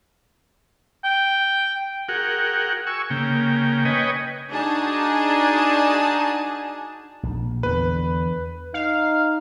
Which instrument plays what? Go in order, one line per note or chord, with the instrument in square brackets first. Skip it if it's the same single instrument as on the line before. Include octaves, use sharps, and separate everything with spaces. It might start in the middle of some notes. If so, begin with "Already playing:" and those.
[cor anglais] G5
[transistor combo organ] F#4 G#4 A#4 F#5 G5
G#5 C#6 E6
C#3 A#3 G5
B4 C#5 D#5 G5 G#5
[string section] D4 D#4 F#4 G#4 A5
[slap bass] A#1
[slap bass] E2 D3 [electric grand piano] B4
[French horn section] D#4 [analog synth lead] F5